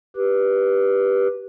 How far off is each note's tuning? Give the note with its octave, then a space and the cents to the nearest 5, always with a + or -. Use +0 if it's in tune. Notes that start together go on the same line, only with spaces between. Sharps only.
G4 +0 B4 -15